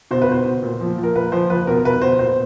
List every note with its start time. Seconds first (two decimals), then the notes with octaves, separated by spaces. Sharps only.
0.11 B2 C5
0.22 B4
0.29 B2 C5
0.46 B2
0.63 A#2
0.81 F3
0.98 F3
1.03 A#4
1.16 A#2 B4
1.32 F3 C5
1.50 F3 B4
1.67 B2 A#4
1.84 B2 B4
2.02 B2 C5
2.19 A#2 C5